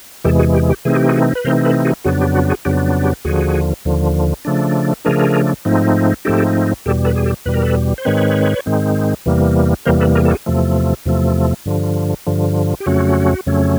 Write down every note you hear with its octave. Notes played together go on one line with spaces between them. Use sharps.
E2 C3 E3 G#3 G4 A4
F#4 G#4
G4
G4
C3 E3 A3 C4 D#4 G#4
G4
F#4 G#4
B4
C3 E3 A3 C4 D#4 A#4 C5
A4 B4
F#4 G#4
F2 C#3 F#3 B3 D4 F#4 G#4
G4
F#4
F#4 G#4
F2 C#3 F#3 B3 D4 G4
G4
D#2 D3 F3 F#4 G#4
D#2 D3 F3
C#3 F3 A3 D4
C#3 F3 A3 D4 G#4 A#4
G#2 F3 A3 C4 D#4
G#2 F3 A3 C4 D#4 G4 A4
E2 B2 G3 G4 A4
A4 B4
G#4
G4 A4
E2 B2 G3 B4
A#4
A4 B4
C5
G#2 D#3 G#3 C4 B4 C#5
G#2 D#3 G#3 C4
E2 C3 E3 G3 A#3
E2 C3 E3 G3 A#3 A#4 C5
A4 B4
G#4 A#4
A4
F#4 G#4
E2 C3 F3 A3
E2 C3 F3 A3
G2 D3 F3
G2 D3 F3
G4
F2 C#3 F#3 A3 C#4 F#4
F2 C#3 F#3 A3 C#4